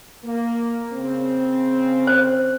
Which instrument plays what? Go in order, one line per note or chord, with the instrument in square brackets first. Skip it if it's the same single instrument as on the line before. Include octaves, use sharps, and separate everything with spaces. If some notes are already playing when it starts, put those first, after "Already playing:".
[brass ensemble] A#3
C#3 C4
[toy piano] C5